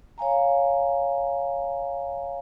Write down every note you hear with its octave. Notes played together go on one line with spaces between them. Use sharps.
C#5 F5 G#5 A#5